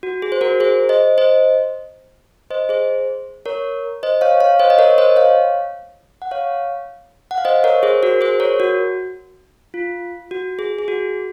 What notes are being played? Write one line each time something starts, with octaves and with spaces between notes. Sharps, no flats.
F#4
G#4
C5
F#4 A#4
G#4 C5
C5 D#5
C5 D#5
C5 D#5
G#4 C5
A#4 C#5
C5 D#5
C#5 F5
C#5 F5
C5 D#5
D#5
A#4 C#5
C#5
C5 D#5
C#5 F5
F#5
C#5 F5
F#5
F5
C5 D#5
A#4 C#5
G#4 C5
F#4 A#4
G#4 C5
A#4 C#5
F#4
F4
F#4
G#4
G#4
F#4